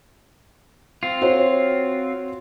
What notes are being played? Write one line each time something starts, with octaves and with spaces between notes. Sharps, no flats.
C4 F4
F#4 C5 C#5